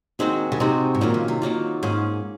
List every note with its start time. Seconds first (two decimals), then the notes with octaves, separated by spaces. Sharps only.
0.19 D#2 D#3 G#3 C4 D#4 F#4
0.52 C#3
0.60 C3 G#3 C4 D#4 F#4
0.95 G#2
1.01 A#2 D#3 F#3 A#3 F4
1.14 C#3
1.28 C3
1.42 D#3 F#3 A#3 F4
1.83 G#2 A#3 C#4 G#4